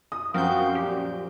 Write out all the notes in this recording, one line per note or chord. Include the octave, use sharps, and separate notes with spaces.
D#6
F#2 F3 C4 F#4 A#4 F5 G6
A#2 G4